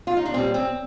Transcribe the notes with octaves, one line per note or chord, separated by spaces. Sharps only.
F4
D#4
D4
A#2 G3 C4
C4